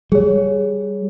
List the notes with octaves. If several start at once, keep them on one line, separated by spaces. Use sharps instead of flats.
G3 G#4 C#5